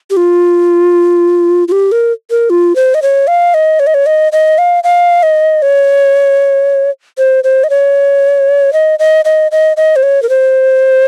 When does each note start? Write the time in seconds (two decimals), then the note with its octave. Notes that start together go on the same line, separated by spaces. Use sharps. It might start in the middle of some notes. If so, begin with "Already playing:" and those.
0.10 G4
0.17 F4
1.68 F4
1.72 G4
1.92 A#4
2.30 A#4
2.50 F4
2.76 C5
2.94 D#5
3.02 C#5
3.27 F5
3.54 D#5
3.80 C#5
3.87 D#5
3.94 C#5
4.06 D#5
4.32 D#5
4.58 F5
4.84 F5
5.23 D#5
5.62 C#5
7.18 C5
7.44 C5
7.64 D#5
7.70 C#5
8.73 D#5
8.99 D#5
9.25 D#5
9.52 D#5
9.77 D#5
9.96 C5
10.03 C#5
10.23 A#4
10.29 C5